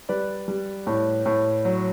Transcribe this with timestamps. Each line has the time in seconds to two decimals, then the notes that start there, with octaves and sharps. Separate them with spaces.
0.09 G3 B4 D5
0.48 G3
0.87 A2
1.26 A2
1.65 F#3